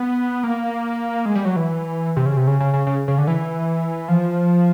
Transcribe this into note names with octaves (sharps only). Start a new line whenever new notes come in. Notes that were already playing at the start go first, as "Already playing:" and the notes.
Already playing: B3
A#3
G#3
G3
F#3
E3
C3
C#3
C3
C#3
C#3
C#3
C#3
C#3
D3
E3
F3